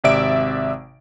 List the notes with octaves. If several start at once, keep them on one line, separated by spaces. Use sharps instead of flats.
G#1 C3 D5 E5 D7